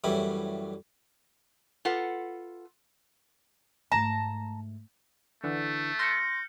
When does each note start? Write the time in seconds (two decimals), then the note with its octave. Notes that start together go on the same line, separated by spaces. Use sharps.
0.04 F#2 A2 E3 G3 E4
1.85 F4 A4 B4 F#5
3.92 G#2 A3 A5 A#5
5.44 D3 E3 A3
5.99 C6 F6 G6 A#6 C#7